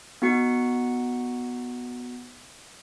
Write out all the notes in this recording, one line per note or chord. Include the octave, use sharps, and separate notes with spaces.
B3 D#4 F#4 F#5 C#7